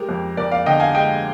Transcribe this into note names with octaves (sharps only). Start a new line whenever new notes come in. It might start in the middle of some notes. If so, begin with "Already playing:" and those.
Already playing: G#3 G4 A#4
F2
F2 A#4 D5
D5 F5
D3 D#5 G5
F5 G#5
G#3 D#5 G5